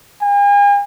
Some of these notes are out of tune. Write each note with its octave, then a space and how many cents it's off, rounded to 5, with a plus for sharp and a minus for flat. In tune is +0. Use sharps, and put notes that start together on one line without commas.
G#5 -45